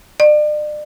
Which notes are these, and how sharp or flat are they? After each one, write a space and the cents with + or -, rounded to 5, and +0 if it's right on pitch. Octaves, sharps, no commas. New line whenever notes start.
D5 +40